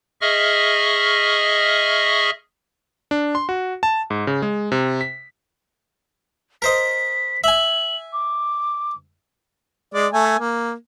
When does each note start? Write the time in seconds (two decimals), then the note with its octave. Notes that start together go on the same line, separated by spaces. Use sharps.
0.21 G#4 D#5 E5 C#6 F6
3.11 D4
3.35 C6
3.49 F#4
3.83 A5
4.10 G#2
4.27 C#3
4.42 G#3
4.72 C3
5.01 B6
6.62 A#4 C5 D#5 B6
7.44 E5 G#5 F#7
8.13 D6
9.94 G#3 D5
10.13 A3 G#5
10.39 A#3